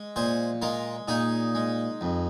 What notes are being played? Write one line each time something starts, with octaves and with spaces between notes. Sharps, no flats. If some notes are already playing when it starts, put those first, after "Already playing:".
Already playing: G#3
A#2 G#4 C5
G#3 F4 A#4
A#2 D#4 G#4
G#3
F2